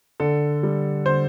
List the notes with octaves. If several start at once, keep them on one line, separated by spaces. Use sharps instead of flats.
D3 A4
G3
D3 C5